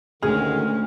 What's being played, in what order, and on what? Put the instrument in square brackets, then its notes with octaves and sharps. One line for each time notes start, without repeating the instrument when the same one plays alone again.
[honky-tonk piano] D2 F6 [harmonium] D3 D#3 [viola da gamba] G#3 C#4 [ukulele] G#4